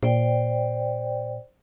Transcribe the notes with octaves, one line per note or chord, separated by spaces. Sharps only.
A#2 C5 D5 G5